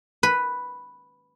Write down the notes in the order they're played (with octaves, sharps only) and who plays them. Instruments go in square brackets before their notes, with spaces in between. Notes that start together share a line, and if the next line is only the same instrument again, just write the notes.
[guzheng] B4